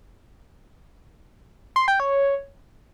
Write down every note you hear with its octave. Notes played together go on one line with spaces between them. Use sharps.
C6
G5
C#5